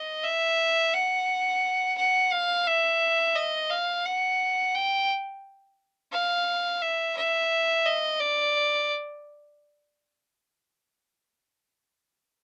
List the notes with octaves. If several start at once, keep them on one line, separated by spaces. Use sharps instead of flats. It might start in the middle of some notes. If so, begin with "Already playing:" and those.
Already playing: D#5
E5
F#5
F#5
F5
E5
D#5
F5
F#5
G5
F5
E5
E5
D#5
D5